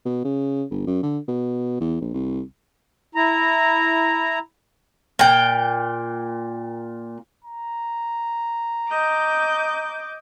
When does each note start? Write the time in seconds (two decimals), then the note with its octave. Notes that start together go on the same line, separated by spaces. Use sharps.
0.05 B2
0.25 C#3
0.71 G1
0.87 F#2
1.03 D3
1.28 B2
1.81 E2
2.01 A#1
2.14 C2
3.15 E4 A#5
5.19 A#2 G5
7.45 A#5
8.89 D#5 D6 G6